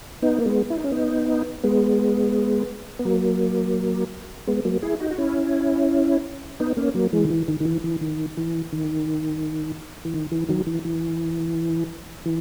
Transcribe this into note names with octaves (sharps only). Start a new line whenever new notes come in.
B3 D#4
A#3
G#3 B3
E4
D#4
C#4
B3 D#4
G#3 B3
B3
F#3 A#3
G#3 B3
F#3 A#3
E4 G#4
D#4 F#4
F#4
C#4 E4
B3 D#4
A#3 C#4
F#3 A#3
E3 G#3
D#3
E3
D#3
D#3
E3
E3
D#3
E3
D#3
E3
D#3
E3
D#3 F#3
E3
E3
E3